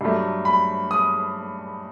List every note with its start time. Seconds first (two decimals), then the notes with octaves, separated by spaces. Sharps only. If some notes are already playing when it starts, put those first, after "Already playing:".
0.01 G2 F#3 A3
0.45 B5
0.91 D#6